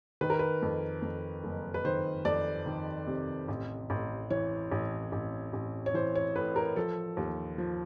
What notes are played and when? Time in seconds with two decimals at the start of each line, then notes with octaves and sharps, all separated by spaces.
0.21 D#3 B4
0.30 A#4
0.39 B4
0.62 F2
1.02 F2
1.44 F#1
1.74 B4
1.85 D#3 C5
2.25 F2 D5
2.66 D#3
3.07 C3
3.48 A1
3.90 A1
4.30 E3 C#5
4.72 A1
5.12 A1
5.53 A1
5.86 C#5
5.94 E3 C5
6.15 C#5
6.35 A2 B4
6.56 A#4
6.76 F3 A4
7.17 D#2
7.58 F3